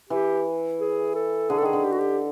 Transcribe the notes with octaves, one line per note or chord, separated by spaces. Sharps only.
E3 G4
G#4
A4
D3 G#4
A4
D#3 G#4
D3
G4
F#4
G4